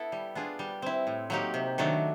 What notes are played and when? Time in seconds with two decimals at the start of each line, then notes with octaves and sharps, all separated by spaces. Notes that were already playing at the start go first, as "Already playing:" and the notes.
Already playing: B3 E4 A4
0.12 G3
0.35 B3 D4 F4 G#4
0.59 G3
0.82 C4 E4
1.07 A2
1.30 F#3 A#3 D#4 G4
1.54 C3
1.78 D#3 F#3 A3 D4